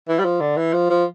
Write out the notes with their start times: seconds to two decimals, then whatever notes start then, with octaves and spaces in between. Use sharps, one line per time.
0.09 E3
0.19 G3
0.25 F3
0.41 D3
0.57 E3
0.73 F3
0.90 F3